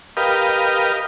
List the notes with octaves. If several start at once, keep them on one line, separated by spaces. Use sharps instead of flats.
G4 A#4 B4 D#5 F5